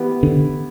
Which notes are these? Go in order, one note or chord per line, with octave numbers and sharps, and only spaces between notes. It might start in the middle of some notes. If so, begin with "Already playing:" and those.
Already playing: E3 B3 E4 G4
D3